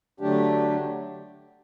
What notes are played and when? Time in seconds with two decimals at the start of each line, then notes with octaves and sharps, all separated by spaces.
0.20 D3 F#3 A3 D4 G4